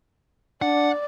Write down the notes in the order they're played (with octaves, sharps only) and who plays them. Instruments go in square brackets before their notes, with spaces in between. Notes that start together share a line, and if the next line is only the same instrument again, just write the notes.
[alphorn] D4 [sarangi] D5 [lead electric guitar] F#5